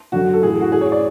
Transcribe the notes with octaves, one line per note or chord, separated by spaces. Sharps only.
F#2 D3 F#4
A4
A2 E3 G#4
F#4
A2 E3 G#4
C#5
D5